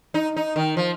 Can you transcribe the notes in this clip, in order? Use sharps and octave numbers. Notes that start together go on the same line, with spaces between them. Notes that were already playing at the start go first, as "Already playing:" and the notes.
D#4
D#4
D#3
F3